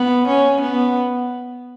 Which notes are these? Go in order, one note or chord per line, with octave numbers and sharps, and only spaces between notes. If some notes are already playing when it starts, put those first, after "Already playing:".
Already playing: B3
C#4
B3